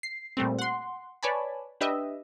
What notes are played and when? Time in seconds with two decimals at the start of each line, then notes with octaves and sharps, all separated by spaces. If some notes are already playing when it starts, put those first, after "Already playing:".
0.03 C7
0.37 A#2 G3 A3 C4
0.59 F#5 C6
1.23 B4 C#5 D5 G#5 A5 B5
1.81 D4 G4 B4 D#5 E5